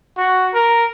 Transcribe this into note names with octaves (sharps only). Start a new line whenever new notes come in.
F#4
A#4